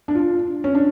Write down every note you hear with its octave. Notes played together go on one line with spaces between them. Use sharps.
D4
F4
C#4
D4